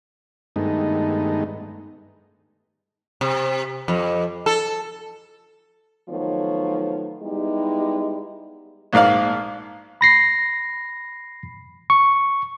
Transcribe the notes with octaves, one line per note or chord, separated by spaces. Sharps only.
G2 D#3 G#3 A3 B3 D#4
C3
F2
A4
D#3 F3 F#3 A3 B3 C#5
G3 G#3 B3 D#4 E4 G4
A#1 G#2 A#3 D5 F5
B5 A#6 C7
C#6